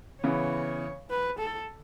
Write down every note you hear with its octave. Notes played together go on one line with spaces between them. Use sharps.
C#3 E3 B3 C#5
B4
A4